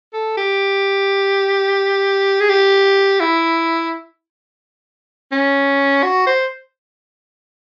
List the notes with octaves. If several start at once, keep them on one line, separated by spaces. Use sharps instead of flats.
A4
G4
G#4
G4
E4
C#4
F#4
C5